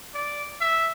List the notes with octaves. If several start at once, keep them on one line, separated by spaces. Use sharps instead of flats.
D5
E5